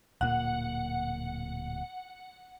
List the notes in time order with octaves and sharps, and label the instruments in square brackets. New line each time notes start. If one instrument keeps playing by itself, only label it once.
[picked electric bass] D1 A#2 A#3 [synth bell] F#5